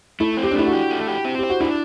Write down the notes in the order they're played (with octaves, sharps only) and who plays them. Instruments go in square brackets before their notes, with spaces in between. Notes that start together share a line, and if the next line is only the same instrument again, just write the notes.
[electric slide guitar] A3 [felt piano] E4
[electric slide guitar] C4
[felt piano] G4
D4
[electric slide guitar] A3 [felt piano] E4
[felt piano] F#4
[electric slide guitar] G4
A3
G4
C4
[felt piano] G4 [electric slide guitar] C5
[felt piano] F#4
[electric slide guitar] D4 [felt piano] E4